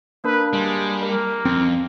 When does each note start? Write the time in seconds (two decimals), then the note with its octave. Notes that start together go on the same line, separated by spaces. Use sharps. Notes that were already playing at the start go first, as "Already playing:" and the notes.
0.24 A#3 D4 A#4 B4
0.53 G3 G#3
1.02 A#3 A#4
1.45 F2 C4